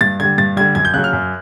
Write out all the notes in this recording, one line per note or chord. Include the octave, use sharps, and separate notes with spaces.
G2 A6
D3 G3 G#6
G2 A6
D3 G3 G#6
F#2 G#6
G6
C#3 F#3 F#6
F6
F#2